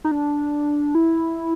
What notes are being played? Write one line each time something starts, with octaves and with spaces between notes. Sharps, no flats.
D#4
D4
E4